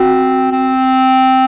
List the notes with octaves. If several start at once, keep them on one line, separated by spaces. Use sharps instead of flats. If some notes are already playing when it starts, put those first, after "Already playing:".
Already playing: C4 F#4
C4